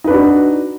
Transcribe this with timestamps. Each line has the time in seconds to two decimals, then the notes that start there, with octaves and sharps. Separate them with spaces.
0.04 D#4
0.07 B4
0.10 D4
0.13 F#4